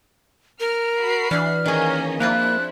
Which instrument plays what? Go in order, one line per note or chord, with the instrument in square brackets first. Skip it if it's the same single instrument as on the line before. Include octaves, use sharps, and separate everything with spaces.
[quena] A#4 [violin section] F6
[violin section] F#4 B5 C7
[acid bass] E3 [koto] D4 [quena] F6
[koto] D#3 G#4 [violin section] A#3 C#4 D#5
[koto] F3 C4 F4 [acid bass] A#3 [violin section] D4 E4 [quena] F#6